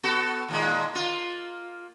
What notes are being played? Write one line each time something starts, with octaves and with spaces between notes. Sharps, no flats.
B3 F#4 A4
D#2 A#2 G#3
A#3 F4